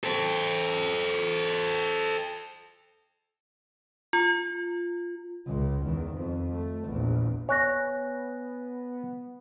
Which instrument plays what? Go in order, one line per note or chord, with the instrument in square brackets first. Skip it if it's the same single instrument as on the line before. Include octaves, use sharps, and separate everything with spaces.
[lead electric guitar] A4 C5
[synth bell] F4
[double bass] C#2 G#3
E2 D#3
F2
A3
A#1 E2
[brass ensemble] B3 [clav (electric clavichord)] C#5 [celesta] G#5 F#6 A#6